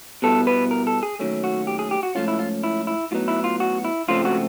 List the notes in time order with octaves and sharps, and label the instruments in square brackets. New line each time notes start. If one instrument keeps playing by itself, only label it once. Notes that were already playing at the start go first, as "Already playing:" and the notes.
[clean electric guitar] B2 G3 B3 E4 A4
B4
A#4
A4
G#4
D#2 D#3 F#3 A3 C#4
F#4
G4
G#4
G4
F#4
G#2 F3 A3 C#4 F4
E4
F4
E4
E4
A2 F#3 B3 D#4 F4
E4
F4
F#4
E4
C#2 C#3 F3 A3 C4 F4
F#4